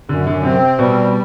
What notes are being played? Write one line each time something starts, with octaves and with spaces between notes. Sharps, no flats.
F#2 D3
D3
C3 C4
B2 G3